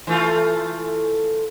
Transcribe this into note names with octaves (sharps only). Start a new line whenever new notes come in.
E3 A3 F4